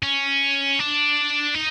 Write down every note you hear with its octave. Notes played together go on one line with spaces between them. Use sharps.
C#4
D4
D#4